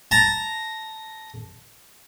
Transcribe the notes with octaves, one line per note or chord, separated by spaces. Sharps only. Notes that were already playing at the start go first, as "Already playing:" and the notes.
A5 A#5